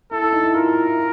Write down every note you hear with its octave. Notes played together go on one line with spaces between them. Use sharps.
E4 A4
E4
D#4
E4
F4 A#4
E4
F4